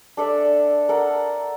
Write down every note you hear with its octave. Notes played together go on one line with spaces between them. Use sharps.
D4 A4 D5 E5
A4 A#4 F#5